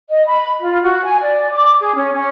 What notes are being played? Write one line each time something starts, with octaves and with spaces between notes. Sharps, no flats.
D#5
B5
F4
F#4
G#5
D5
D6
G#4
C#4
C#4